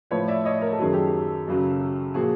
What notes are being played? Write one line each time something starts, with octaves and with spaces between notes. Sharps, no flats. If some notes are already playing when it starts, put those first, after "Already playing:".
A2 F3 B4 C#5
D5 E5
C#5 D#5
A#4
A4
F#2 D#3 F#3 G#4
G4 A4
F#2 C#3 F#3
A#2 F3 F#4 G#4